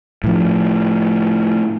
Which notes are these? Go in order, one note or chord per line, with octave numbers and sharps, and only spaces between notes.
A2 F3